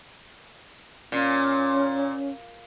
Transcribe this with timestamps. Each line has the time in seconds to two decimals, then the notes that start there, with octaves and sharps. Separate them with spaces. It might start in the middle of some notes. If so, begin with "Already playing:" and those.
1.12 A#2 C#4